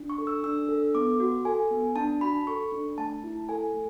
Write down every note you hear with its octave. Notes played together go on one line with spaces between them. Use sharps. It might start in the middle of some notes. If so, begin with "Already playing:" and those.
Already playing: D4
C#6
A4
E6
D4 E6
A4
B3 D6
F#4
A4 G#5
B3
D4 A5
F#4 B5
A4 C#6
D4
A3 A5
E4
A4 G#5
A3